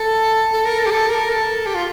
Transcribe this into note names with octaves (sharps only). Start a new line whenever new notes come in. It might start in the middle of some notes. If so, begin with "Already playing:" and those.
Already playing: A4
A4
A#4
A4
G4
A4
A#4
A4
G4
F4